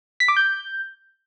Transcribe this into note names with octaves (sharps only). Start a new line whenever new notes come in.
B6
D6
G6